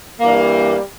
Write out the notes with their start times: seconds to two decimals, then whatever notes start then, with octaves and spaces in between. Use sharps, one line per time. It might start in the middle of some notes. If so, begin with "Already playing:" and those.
0.20 G2 E3 G3 A#3